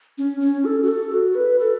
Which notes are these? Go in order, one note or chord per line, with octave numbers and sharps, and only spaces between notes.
C#4
C#4
A4
F#4
A4
F#4
B4
A4